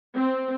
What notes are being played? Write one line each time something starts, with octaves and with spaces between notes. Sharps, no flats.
C4